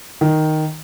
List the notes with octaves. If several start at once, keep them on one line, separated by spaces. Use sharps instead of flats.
D#3